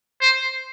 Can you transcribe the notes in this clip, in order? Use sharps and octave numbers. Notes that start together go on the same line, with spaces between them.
C5